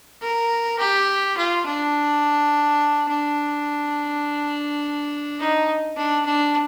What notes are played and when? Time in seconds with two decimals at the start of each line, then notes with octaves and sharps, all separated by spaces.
0.22 A#4
0.79 G4
1.37 F4
1.66 D4
3.09 D4
5.39 D#4
5.97 D4
6.26 D4